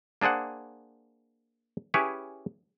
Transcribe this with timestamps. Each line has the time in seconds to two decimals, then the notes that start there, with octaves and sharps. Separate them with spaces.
0.21 A#3 D4 G#4 C5 F#5
1.94 C#4 E4 G4 G#4 B4 C#5